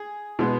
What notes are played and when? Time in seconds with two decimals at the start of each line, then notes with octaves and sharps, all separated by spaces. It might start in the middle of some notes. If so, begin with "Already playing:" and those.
Already playing: G#4
0.39 B2 G#3 B3